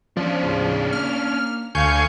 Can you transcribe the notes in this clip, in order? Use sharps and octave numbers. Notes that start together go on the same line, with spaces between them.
F3 C#4 D4
D#2 A2 C#3
A#3 F6
D2 F5 G#5 C#6 G6